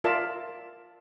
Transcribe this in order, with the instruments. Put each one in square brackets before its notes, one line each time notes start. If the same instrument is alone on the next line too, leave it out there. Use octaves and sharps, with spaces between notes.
[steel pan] F4 A#4 D5 E5 A5